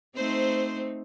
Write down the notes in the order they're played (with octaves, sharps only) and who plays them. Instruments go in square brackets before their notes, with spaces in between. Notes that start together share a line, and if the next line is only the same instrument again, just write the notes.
[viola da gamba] A3 C4 D#4 [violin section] C5